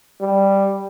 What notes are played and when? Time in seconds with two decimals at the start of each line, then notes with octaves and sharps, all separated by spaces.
0.21 G3